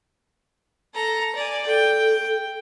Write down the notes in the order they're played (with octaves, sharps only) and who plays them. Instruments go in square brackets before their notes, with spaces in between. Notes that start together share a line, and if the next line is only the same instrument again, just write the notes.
[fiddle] A4 A#5
D5 G#5
[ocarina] A4 [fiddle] G5